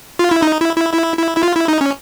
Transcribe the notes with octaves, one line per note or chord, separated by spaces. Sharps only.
F4
E4
D#4
E4
E4
E4
E4
E4
F4
E4
D#4
C#4